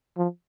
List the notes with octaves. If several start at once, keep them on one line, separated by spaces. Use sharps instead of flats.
F3